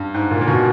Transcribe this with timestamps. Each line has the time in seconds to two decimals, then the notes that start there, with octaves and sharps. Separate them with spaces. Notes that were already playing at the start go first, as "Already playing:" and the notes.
Already playing: G2
0.14 G#2
0.31 A#2
0.41 A#2
0.48 B2